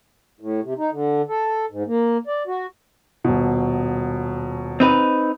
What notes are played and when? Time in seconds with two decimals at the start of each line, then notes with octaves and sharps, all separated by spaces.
0.40 A2
0.62 C3
0.78 D#4
0.92 D3
1.29 A4
1.71 G#2
1.87 A#3
2.27 D5
2.48 F#4
3.24 D#1 B2
4.80 C4 D#4 B4